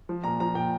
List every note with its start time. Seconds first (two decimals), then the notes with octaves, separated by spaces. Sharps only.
0.09 F3
0.24 A#2 A#5
0.40 F3 A#5
0.55 A#2 G5